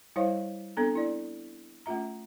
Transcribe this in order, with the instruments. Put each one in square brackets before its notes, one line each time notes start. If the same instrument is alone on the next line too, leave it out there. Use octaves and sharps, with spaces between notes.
[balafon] G3 E4 C5 C#5 F5 C#6
B3 C4 D4 A4 G#5 A#5
E4 D5
A3 C#4 F4 E5 A#5